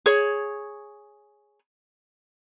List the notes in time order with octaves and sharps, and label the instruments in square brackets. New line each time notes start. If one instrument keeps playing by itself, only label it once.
[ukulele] G#4 C#5